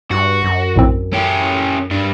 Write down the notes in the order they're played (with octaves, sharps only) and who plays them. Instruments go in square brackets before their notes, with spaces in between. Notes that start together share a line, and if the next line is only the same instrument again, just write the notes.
[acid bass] G2 [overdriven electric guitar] F#4
[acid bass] F#2
[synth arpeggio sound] A#1 A2 C4
[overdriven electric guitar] C#4 G4
G2 D4